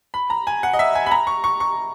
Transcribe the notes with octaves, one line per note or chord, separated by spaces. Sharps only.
B5
A#5
G#5
F#5
D#5
E5
G#5
B5
A#5
C#6
C#6
C#6